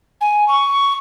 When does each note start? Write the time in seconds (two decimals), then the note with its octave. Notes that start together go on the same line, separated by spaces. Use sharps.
0.21 G#5
0.48 C#6